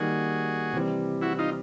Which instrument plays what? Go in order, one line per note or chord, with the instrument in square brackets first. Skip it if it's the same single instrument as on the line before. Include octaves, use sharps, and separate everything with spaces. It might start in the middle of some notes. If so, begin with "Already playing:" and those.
Already playing: [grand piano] D#3 G3 A#3 [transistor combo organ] F#4 G#4
[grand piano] C3 E3 G3 C4
[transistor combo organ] E4 F#4
D#4 F4